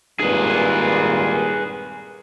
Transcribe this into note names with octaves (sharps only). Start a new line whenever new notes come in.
G#1 G2 A#2 G#4 B4